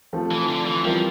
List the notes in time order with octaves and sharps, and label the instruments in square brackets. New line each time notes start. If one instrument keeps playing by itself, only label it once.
[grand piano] F3 A3 C4
[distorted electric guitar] E3
D3
E3
[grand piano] E3 G3 C4 F4 A#4 [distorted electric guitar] F3